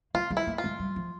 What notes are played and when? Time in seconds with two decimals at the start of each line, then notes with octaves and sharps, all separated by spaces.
0.14 A#3 F4
0.30 G#3
0.37 E4
0.47 A#3
0.58 F4
0.64 G#3
0.80 G3
0.96 F3